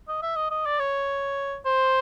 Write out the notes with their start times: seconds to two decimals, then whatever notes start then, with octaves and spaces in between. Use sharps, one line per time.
0.08 D#5
0.23 E5
0.36 D#5
0.51 D#5
0.66 D5
0.79 C#5
1.66 C5